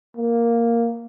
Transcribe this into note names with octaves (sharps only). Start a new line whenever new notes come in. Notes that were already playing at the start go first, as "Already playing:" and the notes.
A#3